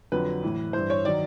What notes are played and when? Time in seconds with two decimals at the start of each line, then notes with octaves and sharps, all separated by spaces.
0.12 F2 D3 F#3 B4
0.43 A2 E3
0.73 G2 E3 C5
0.90 C#5
1.05 D#3 F#3 D5